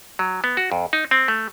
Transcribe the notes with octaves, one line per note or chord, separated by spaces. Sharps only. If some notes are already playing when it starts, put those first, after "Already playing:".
F#3
B3
F#4
F2
D#4
C4
A3